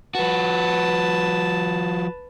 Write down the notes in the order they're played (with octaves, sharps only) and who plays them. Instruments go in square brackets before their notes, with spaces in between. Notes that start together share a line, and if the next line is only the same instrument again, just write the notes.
[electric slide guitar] F3 F#4 [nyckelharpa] B4 A5